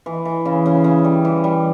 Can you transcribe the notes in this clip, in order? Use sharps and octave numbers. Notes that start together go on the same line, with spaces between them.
E3
E3
C#3
C#3
C#3
G3
E3
G3